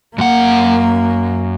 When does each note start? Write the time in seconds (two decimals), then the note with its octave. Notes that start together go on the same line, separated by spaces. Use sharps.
0.18 F#2 A#3 F#5